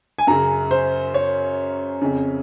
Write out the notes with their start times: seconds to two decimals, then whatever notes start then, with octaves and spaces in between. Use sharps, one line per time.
0.19 G#5
0.27 F#2 C#3 A#5
0.71 C5
1.14 C#5
2.01 F2 C#3